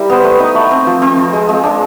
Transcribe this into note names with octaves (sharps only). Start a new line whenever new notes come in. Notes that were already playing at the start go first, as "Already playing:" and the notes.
Already playing: G3 E4 A#4
B3 C5
A3 B4
D#4
A3
C4
F3
C4
F3
G#3
G#3
D4